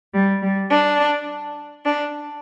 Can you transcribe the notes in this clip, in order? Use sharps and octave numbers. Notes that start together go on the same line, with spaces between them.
G3
G3
D4
D4